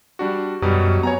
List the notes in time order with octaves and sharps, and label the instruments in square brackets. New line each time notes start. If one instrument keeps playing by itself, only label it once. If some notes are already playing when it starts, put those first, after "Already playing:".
[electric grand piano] G3 D4 F#4
[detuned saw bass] F#2 [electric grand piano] B2 F#3 G3
[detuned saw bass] B3 [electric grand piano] C#5 G#5 A#5